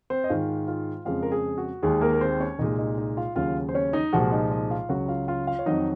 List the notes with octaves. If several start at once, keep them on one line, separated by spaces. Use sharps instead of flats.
C4 C5
D#5
G#2 D#3 G#3 F4 F5
F4 F5
F2 C#3 G#3 F4 F5
A#4
G#4
F#4
D#2 D#3 G#3 G#4
A#3 A#4
A#4
C4 C5
C#4 C#5
C2 A#2 G#3 D#4 D#5
D#4 D#5
D#4 D#5
F4 F5
D#2 C#3 F#3 F4 F5
C5
C#4 C#5
D#4 D#5
C2 A#2 F3 G#3 F#4 F#5
D#4 D#5
D#4 D#5
F4 F5
C#2 C#3 F#3 F#4 F#5
F4 F5
F4 F5
F4 F5
C#5
F2 D#3 F#3 D#4 D#5